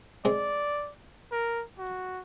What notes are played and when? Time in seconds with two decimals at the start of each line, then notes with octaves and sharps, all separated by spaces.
0.25 G#3 C4 D5
1.32 A#4
1.79 F#4